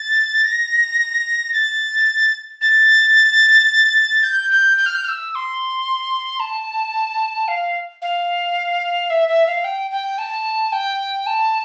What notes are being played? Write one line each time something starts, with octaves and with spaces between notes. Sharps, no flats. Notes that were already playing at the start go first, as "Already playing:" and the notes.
Already playing: A6
A#6
A6
A6
G6
G6
G6
F6
G6
F6
E6
E6
C6
A5
F5
F5
E5
E5
F5
G5
G5
A5
G5
A5